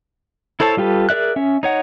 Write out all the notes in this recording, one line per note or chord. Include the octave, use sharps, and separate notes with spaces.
E4 A4 C5 C#5 A5
G3 F4 G4 A4 B4
G#4 A#4 D5 E5 F#6
C#4 E5
D#4 C#5 F#5